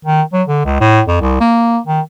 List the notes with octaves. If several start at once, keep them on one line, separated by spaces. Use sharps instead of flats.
D#3
F#3
D3
C#2
A2
F2
C2
A#3
D#3